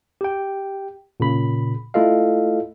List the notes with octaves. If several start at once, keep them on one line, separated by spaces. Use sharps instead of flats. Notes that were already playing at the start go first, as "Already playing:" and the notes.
G4 G5
A#2 C#3 B5
A3 E4 F4 A4 D#5 F5